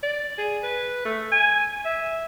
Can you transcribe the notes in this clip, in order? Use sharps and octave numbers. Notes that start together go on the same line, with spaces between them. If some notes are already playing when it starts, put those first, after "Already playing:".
D5
G#4
B4
A3
G#5
E5